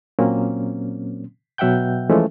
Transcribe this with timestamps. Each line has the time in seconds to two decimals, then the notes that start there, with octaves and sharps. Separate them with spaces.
0.19 A#2 F#3 A#3 C4 C#4
1.58 B2 F#3 E5 F#5 G5 G6
2.10 E3 F3 G#3 A3 C#4